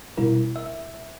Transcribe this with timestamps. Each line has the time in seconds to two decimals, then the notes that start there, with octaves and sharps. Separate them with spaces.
0.17 B2 G3 E4 A#4
0.56 E5